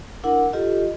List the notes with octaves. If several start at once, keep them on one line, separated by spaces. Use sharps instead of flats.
D4 E4 A#4 F#5
F4 G4 A4 D#5